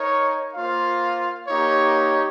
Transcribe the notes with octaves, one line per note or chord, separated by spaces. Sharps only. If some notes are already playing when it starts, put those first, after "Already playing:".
Already playing: D#4 A#4 C#5
A#3 F4 C5 F5
A#3 D#4 G4 C#5